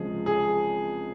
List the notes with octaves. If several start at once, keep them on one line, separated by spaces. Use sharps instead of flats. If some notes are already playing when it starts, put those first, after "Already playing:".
Already playing: C#2 C3 F3 G#3 G#4
G#4